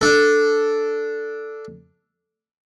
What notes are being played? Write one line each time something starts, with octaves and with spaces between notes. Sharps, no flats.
D4 A4